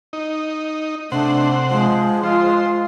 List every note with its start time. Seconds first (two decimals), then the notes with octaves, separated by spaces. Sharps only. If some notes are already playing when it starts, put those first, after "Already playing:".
0.13 D#4
1.12 C3 A3 D4 C5 F#5
1.70 F3 G#3
2.23 F4 C5